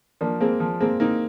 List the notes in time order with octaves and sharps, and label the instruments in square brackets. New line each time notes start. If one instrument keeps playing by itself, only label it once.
[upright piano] F3 [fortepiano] A#3 D4
[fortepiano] G#3 C4 [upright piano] A#3
[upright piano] F3
[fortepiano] G#3 C4 [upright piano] A#3
[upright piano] A#3 [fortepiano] C4 D#4